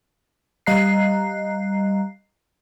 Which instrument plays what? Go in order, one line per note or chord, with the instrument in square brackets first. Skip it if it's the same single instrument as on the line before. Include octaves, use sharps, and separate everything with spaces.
[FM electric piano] G3 D#5 F5 A#5 F#6 C7